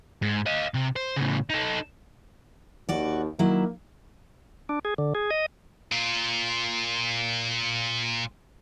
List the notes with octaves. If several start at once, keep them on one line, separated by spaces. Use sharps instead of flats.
G#2
D#5 F5
C3
C5
A2 C#3
D#4 A4
D#2 F#4 D5
D#3 F#3 A#3 E4
D4
G#4
D3
G#4
D#5
A#2 F4